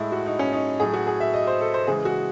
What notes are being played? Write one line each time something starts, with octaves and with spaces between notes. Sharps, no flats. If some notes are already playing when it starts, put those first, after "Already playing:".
Already playing: A2 G#3 E4
F#4
D#4
C#4
D#4
A2 F#3 G#4
F#4
G#4
E5
D#5
C5
A4
C5
C#3 E3 G#3 G#4
F#4